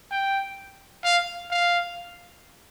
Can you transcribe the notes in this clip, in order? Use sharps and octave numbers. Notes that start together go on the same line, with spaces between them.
G5
F5
F5